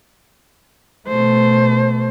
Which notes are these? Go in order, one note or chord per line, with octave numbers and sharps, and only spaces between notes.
B2 A3 C5